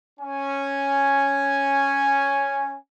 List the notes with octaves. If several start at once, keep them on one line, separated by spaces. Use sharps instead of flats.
C#4 G#5